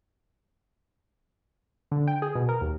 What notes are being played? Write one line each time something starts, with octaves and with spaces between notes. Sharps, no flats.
D3
G5
G#4
B2
A#4
D#2